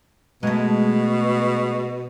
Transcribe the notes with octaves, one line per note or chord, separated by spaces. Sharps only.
B2 G#3 A3